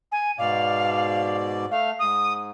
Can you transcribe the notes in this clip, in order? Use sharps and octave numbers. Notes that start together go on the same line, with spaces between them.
G#5
G#2 B2 D5 F5
A3 F5
G#2 D#6